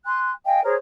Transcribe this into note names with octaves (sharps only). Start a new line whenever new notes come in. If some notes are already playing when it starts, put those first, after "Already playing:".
G#5 C6 F#6
D#5 F5 G5 G#5
G#4 A#4 C5 C#5